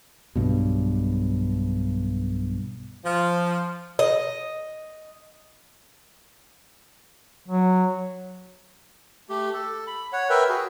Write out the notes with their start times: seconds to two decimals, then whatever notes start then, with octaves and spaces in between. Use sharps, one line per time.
0.36 B1 G2 B2
3.05 F3
3.99 D#5
7.48 F#3
9.29 A3 G4
9.53 A4
9.87 B5
10.13 C#5 F#5
10.30 A#4 B4 E5 G5
10.49 F#4 G#4